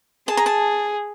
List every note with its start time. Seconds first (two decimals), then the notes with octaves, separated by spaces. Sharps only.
0.28 G#4 A5
0.37 A#5
0.46 A5